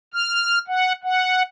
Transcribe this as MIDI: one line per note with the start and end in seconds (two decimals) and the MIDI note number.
0.14 0.59 89
0.68 0.92 78
1.04 1.42 78